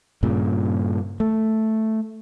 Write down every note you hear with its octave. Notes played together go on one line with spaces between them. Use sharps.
G2 A#2 C#3
A3